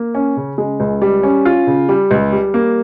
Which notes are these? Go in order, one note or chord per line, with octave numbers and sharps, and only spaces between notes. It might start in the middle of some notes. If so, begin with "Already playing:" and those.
Already playing: A#3
C#4
C#3
G#3
C#2
G3
C#4
F4
C#3
G3
C#2
G3
A#3